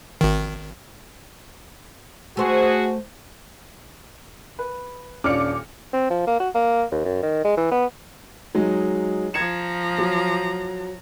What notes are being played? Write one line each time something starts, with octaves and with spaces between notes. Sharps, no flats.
G#1 D#3
A3 F#4 G#4 C5
B4
D#1 C#4 D4 F4 D6 F6 C#7
C4
F3
A#3
F#4
A#3
D#2
F#2
D#3
G#3
E3
B3
F#3 G#3 D#4
F3 A#5 G#6 C#7 E7
F#3